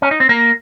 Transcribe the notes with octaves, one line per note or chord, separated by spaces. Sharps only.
C#4
D#4
C4
A#3